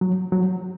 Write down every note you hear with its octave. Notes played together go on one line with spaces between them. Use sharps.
F#3
F#3